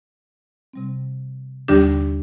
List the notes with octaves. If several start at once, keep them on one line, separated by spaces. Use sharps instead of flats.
C3 G3 C4
D#2 D3 G3 D4 G4